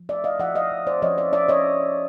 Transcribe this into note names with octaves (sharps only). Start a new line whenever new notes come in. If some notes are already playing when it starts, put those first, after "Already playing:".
Already playing: F3
A3 D5 E5
D#5 F5
F3 E5 F#5
D#5 F5
F3
C5 D5
F3 C#5 D#5
D5 E5
F3 D5 E5
C#5 D#5